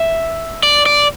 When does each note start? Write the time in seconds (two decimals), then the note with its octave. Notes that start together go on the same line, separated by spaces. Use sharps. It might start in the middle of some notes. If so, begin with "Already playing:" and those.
Already playing: E5
0.63 D5
0.86 D5